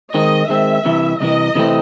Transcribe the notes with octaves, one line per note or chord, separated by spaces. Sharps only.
D#3 G#3 C4 D#5
D#3 G#3 C4 E5
C2 C3 E3
C2 C3 E3 D#5
C3 E3 A3 C4